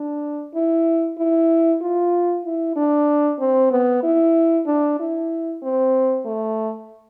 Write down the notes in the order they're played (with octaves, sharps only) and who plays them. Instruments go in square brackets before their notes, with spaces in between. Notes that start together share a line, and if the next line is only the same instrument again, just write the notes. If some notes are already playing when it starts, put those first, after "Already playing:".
Already playing: [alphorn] D4
E4
E4
F4
E4
D4
C4
B3
E4
D4
E4
C4
A3